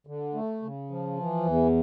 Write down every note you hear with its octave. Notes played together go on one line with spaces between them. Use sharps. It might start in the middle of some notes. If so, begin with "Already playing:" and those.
D3
A3
C#3
F3
E3
E2